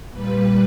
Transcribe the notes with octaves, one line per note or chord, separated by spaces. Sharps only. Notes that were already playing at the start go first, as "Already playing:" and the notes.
A#2 G3 B4